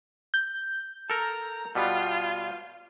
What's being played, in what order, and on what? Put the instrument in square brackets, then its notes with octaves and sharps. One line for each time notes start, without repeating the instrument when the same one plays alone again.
[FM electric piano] G6
[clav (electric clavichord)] A4 A#4 [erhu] A#5
[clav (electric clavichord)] B2 G3 B3 [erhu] F4